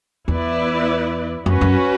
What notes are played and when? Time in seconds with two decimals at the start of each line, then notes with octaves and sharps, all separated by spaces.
0.28 E2 B3 E4 B4 D5
1.46 F#2 C#4 F#4 B4
1.61 F#2